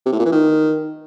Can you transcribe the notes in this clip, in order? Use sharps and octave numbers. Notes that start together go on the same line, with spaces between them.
C3
A2
A#2
E3
D#3